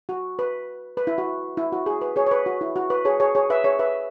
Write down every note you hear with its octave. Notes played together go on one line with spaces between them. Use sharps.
F#4
B4
B4
E4
F#4
E4
F#4
G#4
B4
G#4 C#5
C#5
B4
F#4
E4
F#4
B4
G#4 C#5
G#4 C#5
G#4 C#5
B4 E5
G#4 C#5
B4 E5